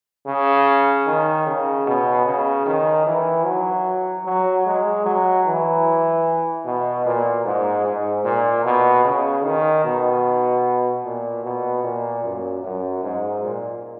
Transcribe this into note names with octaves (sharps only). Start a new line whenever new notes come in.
C#3
D#3
C#3
B2
C#3
D#3
E3
F#3
F#3
G#3
F#3
E3
B2
A#2
G#2
G#2
A#2
B2
C#3
D#3
B2
A#2
B2
A#2
F#2
F#2
G#2
A#2